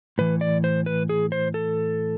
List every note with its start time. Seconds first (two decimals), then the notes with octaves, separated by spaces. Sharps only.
0.18 A2 E3 B4
0.41 D5
0.64 C5
0.86 B4
1.09 G#4
1.32 C5
1.54 A4